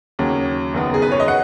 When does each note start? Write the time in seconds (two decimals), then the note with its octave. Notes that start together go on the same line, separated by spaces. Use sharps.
0.19 D#2 C#3 F#3 C#4
0.74 F#1 F#2 D#3 B3
0.94 G#4
1.02 B4
1.12 C#5
1.20 D#5
1.28 F#5